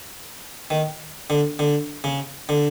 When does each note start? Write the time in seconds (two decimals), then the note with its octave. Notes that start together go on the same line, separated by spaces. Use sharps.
0.70 D#3
1.30 D3
1.59 D3
2.04 C#3
2.49 D3